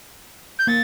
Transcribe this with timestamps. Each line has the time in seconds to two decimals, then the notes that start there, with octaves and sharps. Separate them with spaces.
0.59 G6
0.67 A#3 A6